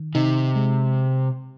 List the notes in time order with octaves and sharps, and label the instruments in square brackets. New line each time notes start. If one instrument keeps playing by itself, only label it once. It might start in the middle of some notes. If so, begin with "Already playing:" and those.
Already playing: [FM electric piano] D#3
[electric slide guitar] C3 [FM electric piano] D#4
[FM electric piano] G#3